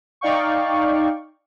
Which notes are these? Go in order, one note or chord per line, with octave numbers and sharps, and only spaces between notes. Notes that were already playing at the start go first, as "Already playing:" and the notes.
D#4 D5 F5 G5 C#6